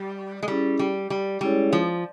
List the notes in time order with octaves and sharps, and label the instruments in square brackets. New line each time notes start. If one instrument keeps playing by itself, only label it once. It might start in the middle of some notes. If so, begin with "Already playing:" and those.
Already playing: [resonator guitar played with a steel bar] G3
G#3
[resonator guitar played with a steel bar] G3 [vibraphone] C#4 E4 G#4
[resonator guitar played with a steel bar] G3
G3
[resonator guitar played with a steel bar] G3 [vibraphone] G#3 C#4 E4 G#4 C#5
[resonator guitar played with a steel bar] F3